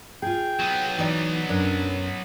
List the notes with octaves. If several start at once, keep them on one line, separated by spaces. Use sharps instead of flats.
F4 G#4 G5
F#3 B3
E3 D#4 D5
F#2 D4